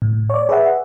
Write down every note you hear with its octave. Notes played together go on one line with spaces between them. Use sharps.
A2
C#5 D5
G#4 B4 E5 F#5